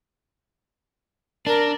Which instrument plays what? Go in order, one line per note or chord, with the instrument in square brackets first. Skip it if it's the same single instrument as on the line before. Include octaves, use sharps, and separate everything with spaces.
[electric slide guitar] D4 [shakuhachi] A#4